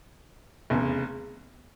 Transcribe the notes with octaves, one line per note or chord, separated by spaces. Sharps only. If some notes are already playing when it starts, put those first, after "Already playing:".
F1 E2 C#3